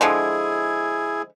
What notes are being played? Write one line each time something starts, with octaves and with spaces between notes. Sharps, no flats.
D3 F3 G#3 E4 G#4 G#5